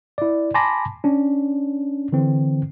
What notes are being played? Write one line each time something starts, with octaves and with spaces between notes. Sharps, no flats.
E4 D5
G#5 A5 B5 C6 D6 A#6
C#4 D4
D3 E3 C4